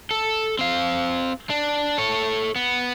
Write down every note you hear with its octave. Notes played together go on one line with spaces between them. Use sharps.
A4
C4 F5
D4
A4 C#5
B3